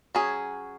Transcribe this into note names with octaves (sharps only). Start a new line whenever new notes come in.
F#3 C#4 G#4